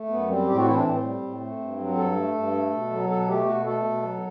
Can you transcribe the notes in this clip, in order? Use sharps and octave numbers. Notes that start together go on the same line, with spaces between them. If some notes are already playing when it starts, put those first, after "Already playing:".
Already playing: A3
F#2 B3
G3 C4
A2 G4
F#4
E3 E4
D4
A2 C4
G3
A2
A3
G2
F#3
G2 A4
A3
G2
A3
B2
F#3
B2 A4
A3 G4
B2 F#4
A3 A4
B2
F#3